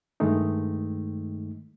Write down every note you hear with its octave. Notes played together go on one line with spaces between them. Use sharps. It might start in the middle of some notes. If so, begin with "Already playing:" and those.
G2 D#3 G#3 A3 D#4